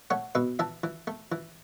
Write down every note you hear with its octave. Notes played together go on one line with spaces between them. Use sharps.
A3 C#5 F#5
B2 B4 E5
E3 E5 A5
E3
A3
E3